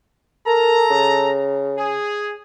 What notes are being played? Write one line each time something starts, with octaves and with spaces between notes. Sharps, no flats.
A4 A#4 A#5
C#3
G#4